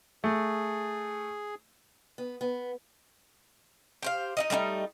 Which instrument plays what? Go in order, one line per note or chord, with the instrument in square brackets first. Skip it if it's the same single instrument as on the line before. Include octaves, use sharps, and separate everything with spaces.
[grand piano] A3 [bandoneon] G#4
[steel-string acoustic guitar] B3
B3
[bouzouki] G4 C5 F5
D#4 E4 D#5
G3 A3 B3 D#4